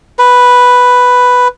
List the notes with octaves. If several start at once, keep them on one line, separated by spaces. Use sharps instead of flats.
B4